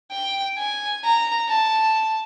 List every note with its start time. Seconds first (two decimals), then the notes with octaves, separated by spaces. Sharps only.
0.11 G5
0.58 G#5
1.04 A#5
1.49 A5